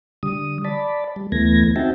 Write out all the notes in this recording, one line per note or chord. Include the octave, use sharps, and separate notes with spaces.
D3 G3 D#6
D5 A5 B5
G3
D2 E3 A3 B3 G#6 A#6
C4 D#4 F#4 E5 G5 A5